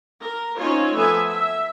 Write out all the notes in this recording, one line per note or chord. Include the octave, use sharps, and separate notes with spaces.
A#4
C4 C#4 D#4 F4 C#5
F3 A3 B3 A4 E5 G#5
E5